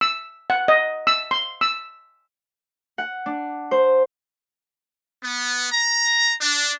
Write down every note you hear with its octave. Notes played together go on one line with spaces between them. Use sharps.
E6
F#5
D#5
E6
C6
E6
F#5
D4
C5
B3
A#5
D4